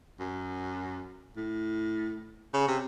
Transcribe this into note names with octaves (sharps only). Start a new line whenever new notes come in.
F#2
A2
C#3
C3